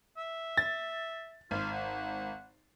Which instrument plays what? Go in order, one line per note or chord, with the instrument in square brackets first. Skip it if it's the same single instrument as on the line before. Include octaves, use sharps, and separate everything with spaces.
[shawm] E5
[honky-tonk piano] A6
[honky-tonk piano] G#1 [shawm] F4
[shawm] F#5